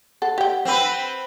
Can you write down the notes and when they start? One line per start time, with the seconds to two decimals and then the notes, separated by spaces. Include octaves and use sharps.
0.22 A4 F#5
0.38 G4 G5
0.65 C4 B4